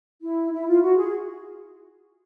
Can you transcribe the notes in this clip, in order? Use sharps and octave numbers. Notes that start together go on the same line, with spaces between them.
E4
E4
F4
F#4
G#4